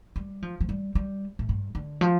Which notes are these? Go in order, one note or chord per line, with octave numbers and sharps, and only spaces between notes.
G3
F3
F3
G3
G3
A2
G2
D3
F3